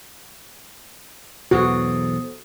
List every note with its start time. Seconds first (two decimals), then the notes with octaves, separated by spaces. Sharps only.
1.51 E1 B1 E2 F#4 A4 C5 D#6